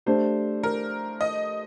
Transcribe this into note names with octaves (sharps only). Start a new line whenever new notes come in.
A3 D4 G4 C5
A#4
D#5